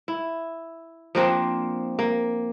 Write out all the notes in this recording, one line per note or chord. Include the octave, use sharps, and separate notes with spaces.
E4
F3 A#3 C4 D4
A#3